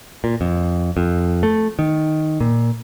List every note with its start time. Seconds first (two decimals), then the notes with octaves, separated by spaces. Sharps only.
0.24 A#2
0.41 F2
0.97 F2
1.43 A3
1.79 D#3
2.40 A#2